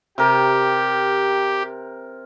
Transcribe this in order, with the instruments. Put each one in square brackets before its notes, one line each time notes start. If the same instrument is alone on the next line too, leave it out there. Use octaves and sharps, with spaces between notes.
[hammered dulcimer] C3 A#4 [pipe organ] G4